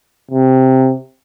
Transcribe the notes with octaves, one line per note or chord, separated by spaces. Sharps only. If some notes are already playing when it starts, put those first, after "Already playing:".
C3